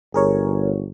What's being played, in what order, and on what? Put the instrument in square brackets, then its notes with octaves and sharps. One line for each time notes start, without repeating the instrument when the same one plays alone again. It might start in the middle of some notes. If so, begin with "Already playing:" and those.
[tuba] G1 [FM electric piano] G#4 A#4 C#5